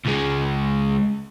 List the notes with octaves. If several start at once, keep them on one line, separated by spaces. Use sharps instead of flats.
C#2 G#3